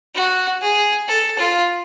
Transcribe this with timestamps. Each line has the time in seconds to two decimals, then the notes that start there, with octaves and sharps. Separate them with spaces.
0.15 F#4
0.62 G#4
1.08 A4
1.39 F4